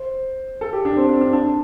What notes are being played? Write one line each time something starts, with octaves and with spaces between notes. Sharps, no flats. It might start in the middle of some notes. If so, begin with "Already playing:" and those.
Already playing: C5
A4
G4
D4
C4
D4
D4
D4